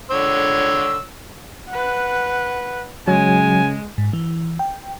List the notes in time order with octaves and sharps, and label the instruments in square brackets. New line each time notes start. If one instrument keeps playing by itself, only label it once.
[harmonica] D3 C#5 E6
[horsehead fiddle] B4 F#5
[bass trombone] C#3 [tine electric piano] F#3 [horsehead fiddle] G#3 [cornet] G#5
[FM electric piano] G#2
E3
G5